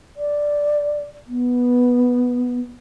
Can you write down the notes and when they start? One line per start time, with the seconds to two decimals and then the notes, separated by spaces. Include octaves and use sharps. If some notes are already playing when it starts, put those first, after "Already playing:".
0.17 D5
1.28 B3